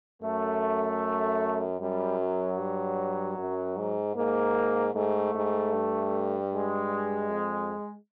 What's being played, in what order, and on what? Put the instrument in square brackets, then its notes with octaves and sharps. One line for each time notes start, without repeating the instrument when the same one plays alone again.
[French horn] F#2 [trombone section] A3
[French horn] F#2 [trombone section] G3
[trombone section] F#3
[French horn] G2
F#2
G#2
[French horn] G#2 [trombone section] A#3
[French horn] G#2 [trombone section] A3
[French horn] G#2
G2
[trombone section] G#3
[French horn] F2